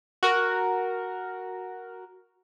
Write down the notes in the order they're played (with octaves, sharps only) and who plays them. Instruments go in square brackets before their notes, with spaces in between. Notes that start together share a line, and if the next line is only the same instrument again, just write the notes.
[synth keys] F#4 A#4